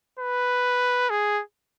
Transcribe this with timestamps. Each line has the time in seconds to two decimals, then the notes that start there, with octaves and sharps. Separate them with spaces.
0.19 B4
1.10 G#4